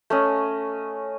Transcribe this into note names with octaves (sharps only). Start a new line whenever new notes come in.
A3 C#4 D#5